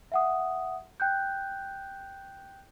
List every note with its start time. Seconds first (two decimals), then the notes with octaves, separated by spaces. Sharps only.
0.12 E5 F#5 D#6
1.00 G5 F#6 G6